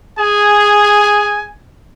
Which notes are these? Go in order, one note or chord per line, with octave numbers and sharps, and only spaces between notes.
G#4 G#5